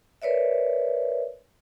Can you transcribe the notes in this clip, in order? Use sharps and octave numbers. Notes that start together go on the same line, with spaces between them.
A#4 B4 C#5 D5 E5